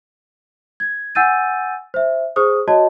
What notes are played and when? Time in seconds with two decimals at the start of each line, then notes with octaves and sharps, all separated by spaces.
0.80 G#6
1.15 F#5 G#5 E6 G6 A6 D#7
1.94 C5 E5
2.36 G#4 C5 D#6
2.68 F#4 C#5 D#5 A5